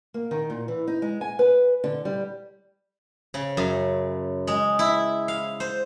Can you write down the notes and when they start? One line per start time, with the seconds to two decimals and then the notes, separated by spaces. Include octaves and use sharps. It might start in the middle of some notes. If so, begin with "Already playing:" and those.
0.14 A#3
0.31 D#3
0.50 A#2
0.68 E3
0.87 D#4
1.02 G#3
1.21 G#5
1.39 B4
1.84 D3
2.05 G3
3.34 C#3
3.57 F#2
4.47 G#3
4.79 E4
5.28 F5
5.60 C5